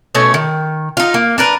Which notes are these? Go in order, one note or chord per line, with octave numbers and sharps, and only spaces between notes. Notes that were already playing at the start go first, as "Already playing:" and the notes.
B2 A3 C#4
D#3
D#4 F4
A#3
D4 A#4 B4